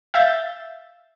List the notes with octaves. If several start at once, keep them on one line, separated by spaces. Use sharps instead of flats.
E5 F5 G6 A6